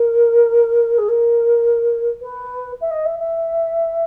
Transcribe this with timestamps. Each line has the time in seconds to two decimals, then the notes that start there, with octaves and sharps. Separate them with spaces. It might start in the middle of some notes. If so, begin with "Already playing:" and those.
Already playing: A#4
0.97 G#4
1.08 A#4
2.21 B4
2.80 E5
2.90 D#5
3.05 E5
3.19 E5